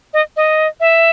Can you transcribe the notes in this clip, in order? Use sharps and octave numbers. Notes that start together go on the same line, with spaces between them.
D#5
D#5
E5